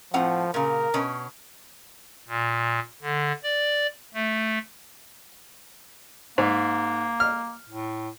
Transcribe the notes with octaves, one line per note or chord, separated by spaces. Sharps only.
A2 F3 C4 F#5
A#2 C#3 A#4
B2 C#4
A#2
D3
D5
A3
G#2 A#3
F6
A2